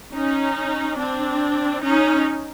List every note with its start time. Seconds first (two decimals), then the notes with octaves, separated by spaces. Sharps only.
0.15 C#4 D#4
0.99 C4 D4
1.83 C#4 D#4